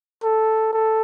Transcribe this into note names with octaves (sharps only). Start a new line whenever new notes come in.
A4
A4